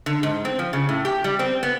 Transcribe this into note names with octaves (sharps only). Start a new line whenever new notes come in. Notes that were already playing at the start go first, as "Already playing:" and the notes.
D3
G#2
C4
F3
C#3
A2
G4
G3
C4
B3